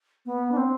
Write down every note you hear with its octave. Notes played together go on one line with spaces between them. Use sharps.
B3
D4
C4